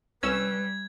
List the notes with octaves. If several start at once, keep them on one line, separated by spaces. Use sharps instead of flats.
C2 G3 C#4 B4 E6 G#6